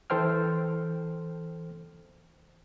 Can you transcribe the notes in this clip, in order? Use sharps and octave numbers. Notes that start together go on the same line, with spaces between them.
E3 A4 C5 G5 F6